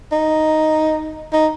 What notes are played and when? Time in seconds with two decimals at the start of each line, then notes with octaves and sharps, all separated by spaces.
0.12 D#4
1.33 D#4